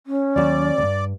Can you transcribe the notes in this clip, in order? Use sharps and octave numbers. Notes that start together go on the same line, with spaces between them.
C#4
D#2 F#3 D5
C#2 G2